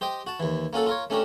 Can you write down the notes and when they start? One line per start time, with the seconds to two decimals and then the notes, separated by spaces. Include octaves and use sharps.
0.01 G4 C5 D#5 G5
0.27 F#4 A5
0.40 D#2 E3
0.73 A#3 C#4 F#4 A4
0.87 F4 A#4 C#5
1.10 A3 C#4 D4 G4 A#4